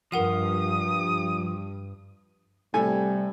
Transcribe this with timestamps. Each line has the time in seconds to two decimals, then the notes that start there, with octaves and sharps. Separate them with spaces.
0.12 G2 F3 A#4 F#5 D#6 D#7
2.74 A2 C3 G3 A4 G#5